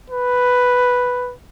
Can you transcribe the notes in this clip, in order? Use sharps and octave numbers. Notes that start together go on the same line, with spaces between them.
B4